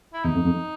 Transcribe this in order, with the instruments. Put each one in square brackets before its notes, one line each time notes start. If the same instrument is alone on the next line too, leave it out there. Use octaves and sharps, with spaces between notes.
[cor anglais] E4
[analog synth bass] E2 [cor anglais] D#4
[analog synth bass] F2
F2